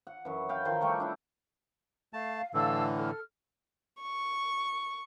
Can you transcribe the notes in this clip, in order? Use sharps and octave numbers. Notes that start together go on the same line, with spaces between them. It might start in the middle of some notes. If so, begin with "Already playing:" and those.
F#5
F#2 E3
B4 F5 G5
D#3 F3 A#4 C6
G3 A3 G5 C#6
D4 E4
A3 F5 A5
A2 D3 E3 F5 A5 E6
A4 F6
C#6